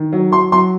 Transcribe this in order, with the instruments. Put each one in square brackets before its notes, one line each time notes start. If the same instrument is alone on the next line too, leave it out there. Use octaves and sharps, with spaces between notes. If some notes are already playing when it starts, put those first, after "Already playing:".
Already playing: [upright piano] D#3
F#3
F#3 C6
F#3 C6